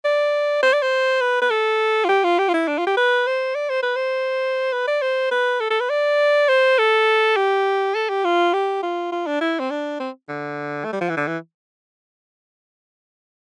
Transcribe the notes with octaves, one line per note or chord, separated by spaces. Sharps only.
D5
C5
D5
C5
B4
B4
A4
F4
G4
F4
G4
F4
E4
D4
F4
G4
B4
C5
D5
C5
B4
C5
B4
D5
C5
B4
A4
A4
B4
D5
C5
A4
G4
A4
G4
F4
G4
F4
F4
D4
E4
C4
D4
C4
D3
A3
G3
F3
E3
D3
E3